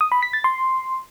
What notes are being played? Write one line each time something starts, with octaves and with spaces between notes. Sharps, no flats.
D#6
B5
B6
A6
C6